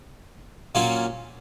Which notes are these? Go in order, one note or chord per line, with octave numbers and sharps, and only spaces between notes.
A#2 F#3 A#3 C#4 F4